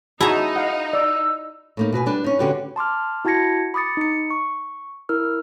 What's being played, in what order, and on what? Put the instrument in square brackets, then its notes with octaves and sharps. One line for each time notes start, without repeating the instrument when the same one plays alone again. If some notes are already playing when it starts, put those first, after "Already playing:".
[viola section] D#4 [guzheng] E4 A#5 [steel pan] F#4 G#4 A5
[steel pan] F5 F#5
[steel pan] D5 [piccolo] E6
[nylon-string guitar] A2 A#3 D#4
B2 F#4 B4 G#5
G3 D4 B4
C#4 D#4
D3 C#4 F#4 G4 A4 B4
[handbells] A5 C6 D6 F6
E4 F#4 A5 G#6 A#6 C#7
B5 D6 D#6 A6 C#7
D#4 C#7
C#6
E4 A#4 E6 F6